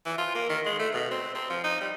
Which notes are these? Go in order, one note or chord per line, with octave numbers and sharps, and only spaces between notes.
E3
F4
A#3
D#3
G#3
A3
B2
C4
C4
F3
D#4
G3